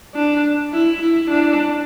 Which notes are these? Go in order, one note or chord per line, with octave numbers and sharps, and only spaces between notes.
D4
E4
E4
D4